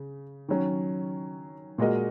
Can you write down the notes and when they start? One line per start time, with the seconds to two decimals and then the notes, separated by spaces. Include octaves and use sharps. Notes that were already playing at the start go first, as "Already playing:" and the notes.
Already playing: C#3
0.48 D#3 F#3 C#4
1.78 A#2 G#3 F#4 A#4 D#5